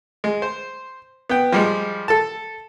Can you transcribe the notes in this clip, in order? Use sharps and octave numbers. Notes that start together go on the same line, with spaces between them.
G#3
C5
B3 G5
F3 G3 G#3
A4 A5